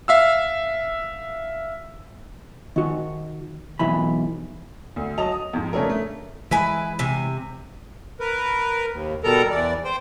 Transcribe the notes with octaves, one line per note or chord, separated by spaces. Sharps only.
E5 F5 E6
D#3 F#4
B1 E3 B5
D2
F#3 D#5 A5 F7
D#6
F2 G#2
C#3 A3 C#4 D4 A4 A#4
A3
E3 G#3 E4 B4 G#5
C3 G#5
A#4 B4
D#2
B2 G3 B3 A4 A#4 A#5
E2 E3 D5
C5 G5